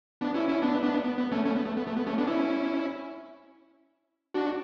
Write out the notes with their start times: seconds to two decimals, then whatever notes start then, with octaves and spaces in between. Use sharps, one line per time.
0.21 B3 D4
0.34 C#4 E4
0.49 C#4 E4
0.62 B3 D4
0.83 B3 D4
1.04 B3
1.18 B3
1.32 A3 C#4
1.45 A3 C#4
1.55 B3
1.66 A3
1.77 B3
1.87 A3
1.96 B3
2.07 A3 C#4
2.17 B3 D4
2.27 C#4 E4
4.34 D4 F#4